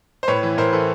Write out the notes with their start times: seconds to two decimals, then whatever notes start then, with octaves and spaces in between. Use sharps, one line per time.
0.23 C5
0.28 A2 B4 C#5
0.43 E3
0.58 A2 A#4 C5
0.73 E3 A4 B4